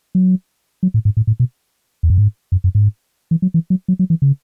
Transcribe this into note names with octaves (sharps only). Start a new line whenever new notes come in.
F#3
F#3
A2
G#2
A2
A2
B2
E2
F#2
G#2
F#2
F#2
G#2
E3
F#3
E3
F#3
F#3
F#3
E3
C#3